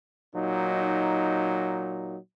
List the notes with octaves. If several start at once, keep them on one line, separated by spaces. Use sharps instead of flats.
A#2 F#3 D#4